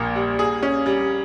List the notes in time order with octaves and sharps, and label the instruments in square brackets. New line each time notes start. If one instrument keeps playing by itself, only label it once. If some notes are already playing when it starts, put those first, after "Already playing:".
Already playing: [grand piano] A#1 A#2 A#3
G3
G#4
C#4
G3